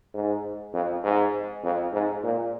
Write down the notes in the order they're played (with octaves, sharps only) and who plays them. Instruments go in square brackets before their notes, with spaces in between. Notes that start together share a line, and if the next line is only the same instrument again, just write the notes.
[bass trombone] G#2
F2
G#2
F2
G#2
A#2